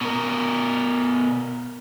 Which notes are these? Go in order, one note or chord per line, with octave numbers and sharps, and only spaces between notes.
B2 A#4